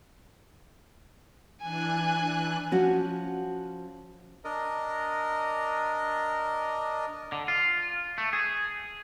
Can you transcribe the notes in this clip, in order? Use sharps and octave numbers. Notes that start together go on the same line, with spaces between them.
E3 D4 G#5 F#6
F3 C#4 F#4
D4 A#4 D#5
D3
F4
A3
G#4